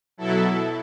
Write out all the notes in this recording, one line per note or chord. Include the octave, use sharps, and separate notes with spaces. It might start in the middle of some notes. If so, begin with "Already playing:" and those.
B2 F#3 E4 A4